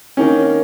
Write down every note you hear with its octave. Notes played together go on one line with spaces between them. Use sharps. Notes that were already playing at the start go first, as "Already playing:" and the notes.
D#3 A#3 C#4